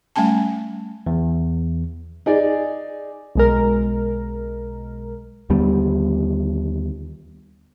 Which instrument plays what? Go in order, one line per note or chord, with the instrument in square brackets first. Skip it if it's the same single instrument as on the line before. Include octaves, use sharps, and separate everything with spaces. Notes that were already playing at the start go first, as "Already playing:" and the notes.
[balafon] G3 A3 C#4 G#5 A5
[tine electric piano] E2
[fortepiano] D#4 G#4 D5
[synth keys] B1 G#3 A#4
[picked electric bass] D#2 D3 G3 B3